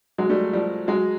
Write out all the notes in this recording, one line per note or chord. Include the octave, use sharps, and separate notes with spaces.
F#3 G#3
G3 A3
F3 G3
F#3 G#3